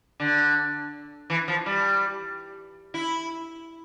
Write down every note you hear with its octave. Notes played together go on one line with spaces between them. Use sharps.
D3
E3
F3
G3
E4